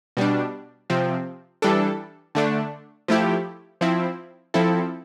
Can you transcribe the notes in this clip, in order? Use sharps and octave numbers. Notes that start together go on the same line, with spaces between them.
B2 G3 D4
C3 F3 C4
E3 G3 D4 A4
D3 A3 D4
F3 A3 E4 G4
F3 C4 E4
F3 C4 E4 A4